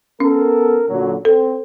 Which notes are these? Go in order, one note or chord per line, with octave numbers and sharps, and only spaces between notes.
B3 C#4 A4 A#4
A#2 D3 F#3
C4 A4